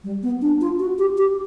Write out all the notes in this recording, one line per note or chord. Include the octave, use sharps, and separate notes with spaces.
G3
B3
D4
F4
F#4
G4
G4